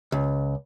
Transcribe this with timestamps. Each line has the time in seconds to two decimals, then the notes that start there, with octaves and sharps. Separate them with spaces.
0.12 C#2